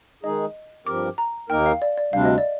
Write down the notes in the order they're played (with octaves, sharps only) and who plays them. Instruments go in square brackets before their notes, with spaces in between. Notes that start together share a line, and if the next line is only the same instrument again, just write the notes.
[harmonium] D#3 G#3 D#4 G#4 [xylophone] D#5
[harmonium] G2 F3 C4 G4 A#4 [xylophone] D6
[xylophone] A#5
[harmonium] D#2 D#3 A#3 D#4 A#4 [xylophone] G5
[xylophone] F5
D5
D5
[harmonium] D2 C3 G3 D4 [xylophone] F5
[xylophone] D#5
D5